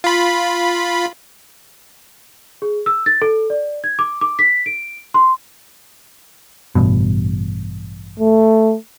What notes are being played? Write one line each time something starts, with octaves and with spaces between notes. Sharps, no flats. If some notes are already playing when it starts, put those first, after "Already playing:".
F4 B5
G#4
E6
A6
A4
D5
G#6
D6
D6
B6
D7
C6
A1 G2 B2
A3